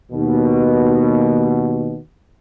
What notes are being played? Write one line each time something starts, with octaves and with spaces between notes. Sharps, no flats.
D#2 B2